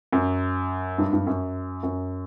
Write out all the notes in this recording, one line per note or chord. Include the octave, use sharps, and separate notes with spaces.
F#2
G2
G2
F#2
F#2